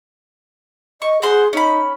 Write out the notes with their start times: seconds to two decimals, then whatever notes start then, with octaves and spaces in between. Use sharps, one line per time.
1.02 D#5 C#6
1.22 F#4 G#4 C5 C6
1.53 C#4 D#4 B5